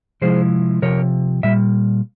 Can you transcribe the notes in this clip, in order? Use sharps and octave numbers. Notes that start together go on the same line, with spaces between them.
C3 F3 G#3 E4 G#4 C5
C3 F3 A#4 C#5
A#2 G3 E5